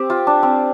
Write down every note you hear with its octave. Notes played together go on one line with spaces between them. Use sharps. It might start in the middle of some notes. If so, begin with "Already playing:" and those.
Already playing: C4 G4
F4
D4
C4